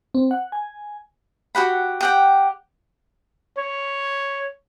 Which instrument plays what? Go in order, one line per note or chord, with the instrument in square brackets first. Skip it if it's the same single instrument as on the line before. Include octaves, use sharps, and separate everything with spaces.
[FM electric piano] C4
F#5
G#5
[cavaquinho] F#4 G4 F#5 B5
G4 F#5 G5
[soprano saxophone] C#5